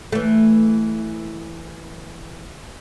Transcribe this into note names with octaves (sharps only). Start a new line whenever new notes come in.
E3 A3